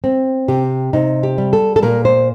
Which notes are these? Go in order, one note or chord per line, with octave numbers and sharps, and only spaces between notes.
C4
C3 G4
C3 D#4
G4
G3
A4
A4
A#2 A#4
C5